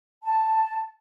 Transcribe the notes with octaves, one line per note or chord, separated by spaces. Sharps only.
A5